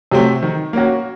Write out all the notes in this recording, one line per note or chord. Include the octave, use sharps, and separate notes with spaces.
C3 F#3 A3 C4
D#3
A#3 C#4 F#4